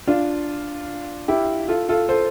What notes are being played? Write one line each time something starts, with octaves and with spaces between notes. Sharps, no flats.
D4 F4
E4 G4
F4 A4
F4 A4
A4 C5